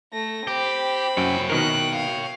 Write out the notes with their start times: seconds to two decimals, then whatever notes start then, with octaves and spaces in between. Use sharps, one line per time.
0.13 A3 A#6
0.47 C4 G4 B5
1.17 F#2 C#5 G5
1.50 B2 D#3 A#4 F#6
1.95 F5